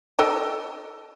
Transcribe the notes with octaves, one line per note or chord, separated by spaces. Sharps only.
A4 D#5 G5